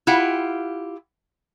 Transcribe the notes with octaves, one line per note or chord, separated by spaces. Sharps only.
E4 F4 G4 F5 F#5